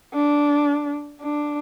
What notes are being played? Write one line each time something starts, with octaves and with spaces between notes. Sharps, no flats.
D4
D4